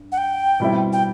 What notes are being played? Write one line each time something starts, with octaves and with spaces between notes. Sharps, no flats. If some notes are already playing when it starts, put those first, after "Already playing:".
Already playing: G2
F#5
G5
B2 G3 C4 E4
G5